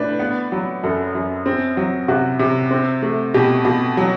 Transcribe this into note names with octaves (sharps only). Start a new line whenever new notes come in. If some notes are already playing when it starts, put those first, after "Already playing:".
Already playing: A2 D4 B4
B3
F#3
F#2 A4
F#2
C4
F#3
C3 F#4
C3
C4
A3
B2 G4
B2
F#3